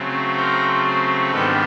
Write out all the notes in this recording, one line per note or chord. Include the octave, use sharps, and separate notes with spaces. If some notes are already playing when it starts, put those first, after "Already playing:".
Already playing: C#3 F#3 A3 C4
A#4 C5
G#2 D#3 G3 B3 D4 A4 B4